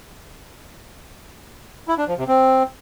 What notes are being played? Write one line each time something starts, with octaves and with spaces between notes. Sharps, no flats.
E4
D4
F3
C3
C4